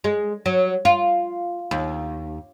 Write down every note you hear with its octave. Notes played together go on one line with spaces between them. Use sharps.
G#3
F#3
F4
D#2